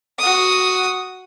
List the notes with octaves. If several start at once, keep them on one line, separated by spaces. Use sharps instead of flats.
F#4 D#6